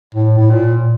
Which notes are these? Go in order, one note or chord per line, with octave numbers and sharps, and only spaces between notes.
A2
A2
A#2